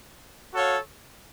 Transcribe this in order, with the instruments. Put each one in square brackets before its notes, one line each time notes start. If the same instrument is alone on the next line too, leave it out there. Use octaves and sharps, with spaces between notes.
[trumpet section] F#4 A4 C#5 F5